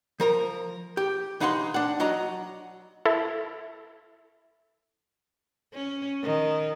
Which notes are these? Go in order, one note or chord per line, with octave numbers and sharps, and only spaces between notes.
F3 A#4 A#5
G4
E3 D#4 F5 F#5 A#5 C6
D4 F#5
F#3 F#4 D#5 F#5 A#5
E4 A4
C#4
D#3